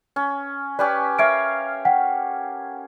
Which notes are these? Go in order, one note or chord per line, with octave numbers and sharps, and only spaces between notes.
C#4
C#4 G4 B4 D5
A#4 C#5 E5 F5 D7
F#5 G5 B6